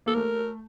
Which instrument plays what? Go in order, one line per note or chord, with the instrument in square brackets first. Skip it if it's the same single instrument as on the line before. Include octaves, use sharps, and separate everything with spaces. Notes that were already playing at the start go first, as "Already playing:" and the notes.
[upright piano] A#3 [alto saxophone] A4
[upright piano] A3 [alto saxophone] A#4